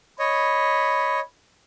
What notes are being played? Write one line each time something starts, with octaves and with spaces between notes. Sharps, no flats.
C#5 D#5 B5